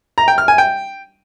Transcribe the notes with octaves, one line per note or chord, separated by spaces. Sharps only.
A#5
G5
F6
G#5
G5